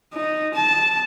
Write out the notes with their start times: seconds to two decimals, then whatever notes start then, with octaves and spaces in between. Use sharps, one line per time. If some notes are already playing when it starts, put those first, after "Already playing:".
0.14 D#4
0.54 A5